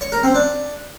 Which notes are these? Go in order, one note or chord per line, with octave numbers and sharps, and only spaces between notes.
C#5
A#4
C4
D4